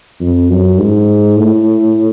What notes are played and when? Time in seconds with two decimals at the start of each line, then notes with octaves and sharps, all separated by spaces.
0.21 F2
0.50 F#2
0.79 G#2
1.37 A2